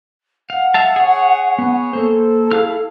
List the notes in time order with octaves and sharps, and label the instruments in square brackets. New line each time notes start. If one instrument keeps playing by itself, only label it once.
[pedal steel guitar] F5 [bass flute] F#5
[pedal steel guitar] E5 F5 A5
G#4 C#5
[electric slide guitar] B3
[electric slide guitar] A#3 C5 [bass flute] A4
[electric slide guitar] E4 G#4 [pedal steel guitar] F5 F6